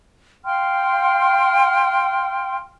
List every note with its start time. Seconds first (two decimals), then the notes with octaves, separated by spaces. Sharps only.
0.45 F5 G5 C6 F6